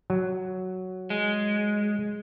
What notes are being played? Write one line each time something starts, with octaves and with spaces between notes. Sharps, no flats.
F#3
G#3